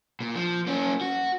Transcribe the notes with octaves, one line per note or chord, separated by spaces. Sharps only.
A#2
F3
A#3 C#4
F#4